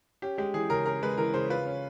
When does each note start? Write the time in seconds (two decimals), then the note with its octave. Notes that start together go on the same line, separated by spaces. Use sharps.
0.22 C#4 G4
0.38 G#3 G4
0.54 E3 G#4
0.70 C#3 A#4
0.86 C#4 A#4
1.02 G#3 B4
1.18 E3 A#4
1.34 C#3 C5
1.50 F4 B4
1.66 C#4